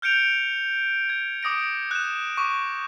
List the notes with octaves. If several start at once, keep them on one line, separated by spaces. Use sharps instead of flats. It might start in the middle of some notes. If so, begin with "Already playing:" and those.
F6 G6 C#7 D7 F7
G#6
D6 D#6 A#6 D7
F#6 E7
C#6 D6